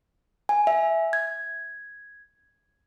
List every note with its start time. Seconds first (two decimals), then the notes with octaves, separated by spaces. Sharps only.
0.49 G#5
0.67 E5
1.13 G#6